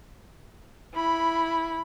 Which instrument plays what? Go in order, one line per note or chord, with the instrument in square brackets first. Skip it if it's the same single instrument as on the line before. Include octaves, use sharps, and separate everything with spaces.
[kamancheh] E4 B5